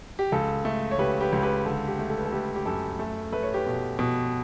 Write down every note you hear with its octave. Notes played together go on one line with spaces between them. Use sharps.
G4
C#2 A4
A3
C#5
C#2 G4 B4
G4 B4
C#2
G4 B4
D3 A4
G4
A3
A4
B4
A4
A3 G4 B4
G4
F#2 A4
A3 A4
A3 B4
C#5
G4 B4
B2
B2